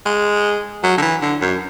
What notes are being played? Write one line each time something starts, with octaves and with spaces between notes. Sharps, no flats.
G#3
F#3
D3
E3
D3
F#2